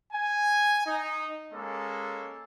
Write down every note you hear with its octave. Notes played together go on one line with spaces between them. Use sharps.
G#5
D#4
G#3 A#3 C#4 A4